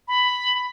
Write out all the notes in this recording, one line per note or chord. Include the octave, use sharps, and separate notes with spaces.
B5